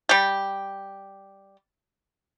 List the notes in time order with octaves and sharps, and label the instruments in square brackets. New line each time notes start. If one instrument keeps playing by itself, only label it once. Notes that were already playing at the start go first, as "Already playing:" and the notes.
[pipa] G3 G4